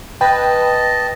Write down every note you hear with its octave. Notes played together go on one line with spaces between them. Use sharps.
B4 D#5 G5 A5